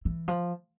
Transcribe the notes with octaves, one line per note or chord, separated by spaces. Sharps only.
E3
F3